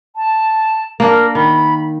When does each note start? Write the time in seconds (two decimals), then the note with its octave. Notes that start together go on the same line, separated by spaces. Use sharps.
0.16 A5
1.00 A#3 D4 A#4
1.35 D#3 B5